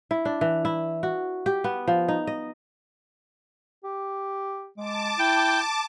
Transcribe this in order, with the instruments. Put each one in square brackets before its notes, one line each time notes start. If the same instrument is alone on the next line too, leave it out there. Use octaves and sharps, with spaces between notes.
[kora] E4
D4
E3
E4
F#4
G4
B3
F3
D#4
D#5
[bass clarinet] G4
[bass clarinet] G#3 [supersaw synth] A5 D6
[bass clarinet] E4 [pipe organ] G5